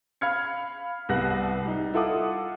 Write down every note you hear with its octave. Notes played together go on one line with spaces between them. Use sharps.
F5 B5 F6 G#6 C#7
C2 G3 B3 F#5 F#6 A#6
G3 D#4
E4 F4 A4 F#5 D6 D#6